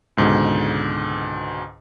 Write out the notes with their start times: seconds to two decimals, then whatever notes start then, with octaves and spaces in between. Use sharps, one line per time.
0.17 C#2 G#2 B2 D3